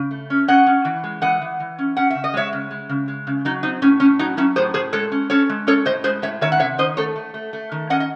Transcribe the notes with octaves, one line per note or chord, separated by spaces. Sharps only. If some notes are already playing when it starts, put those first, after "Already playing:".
Already playing: C#3
A3
C#4
C#4 D#5 F#5
C#4
E3
G#3
E3 D#5 F#5
E3
E3
C#4
C#4 F#5
C#3 E5
D#5
G#3 C#5 E5
C#3
G#3
C#3
G#3
C#3
F#3 D#4
C4 D#4
A2 C#4
A2 C#4
F#3 D#4
F#3 C#4 E4
A2 G#4 C5
A2 G#4 C5
G#3 A4 C#5
C#4
C#4 A4 C#5
G#3
C#4 A4 C#5
A2 C5 D#5
G#3 G#4 C5
A2 C#5 E5
D#3 C#5 E5
F#5
C3 C#5 E5
D#3 C5 D#5
A3 A4 C#5
A3
A3
A3
D#3
C#4 D#5 F#5
D#5